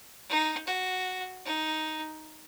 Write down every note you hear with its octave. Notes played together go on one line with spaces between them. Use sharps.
D#4
F#4
D#4